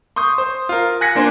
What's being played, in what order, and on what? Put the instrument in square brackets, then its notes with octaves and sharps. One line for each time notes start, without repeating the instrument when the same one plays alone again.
[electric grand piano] C6 C#6 D#6 G6
C5
F4 A#4
G#5 F#6 G#6 A#6 B6 C#7
A#3 D4 C5 G#5 C6